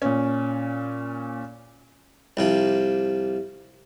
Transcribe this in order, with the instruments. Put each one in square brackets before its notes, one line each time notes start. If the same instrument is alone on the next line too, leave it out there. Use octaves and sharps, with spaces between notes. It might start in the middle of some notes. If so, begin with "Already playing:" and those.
[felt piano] A#2 C#4
[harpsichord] C2 C3 F3